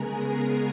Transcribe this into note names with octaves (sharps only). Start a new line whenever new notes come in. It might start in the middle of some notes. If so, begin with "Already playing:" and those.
Already playing: C#3 G#3 B3 G#4 A#4 G#5 A#5